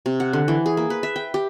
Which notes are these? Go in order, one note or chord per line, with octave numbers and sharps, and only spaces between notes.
C3
F#5
D3
E3
G#4
A#3
B4
E5
G5
G4